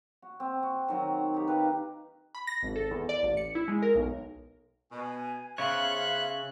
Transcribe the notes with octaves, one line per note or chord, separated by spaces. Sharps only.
F#4
C4
F#4
D#3 F#3 A#5
D#4 G4
B4 F5 A#5
B5
A#6
G#1
A4
E2
D5
A1
C#7
E4
G#3
A#4
B1
B2 G#5
C#3 B3 C5 C#5 E5 F5 F#6